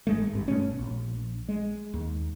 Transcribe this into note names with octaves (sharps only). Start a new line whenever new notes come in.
G#1 G#3 A3
G#1 G2
G1 B2 A3 C#4
A#1
G#3
D#2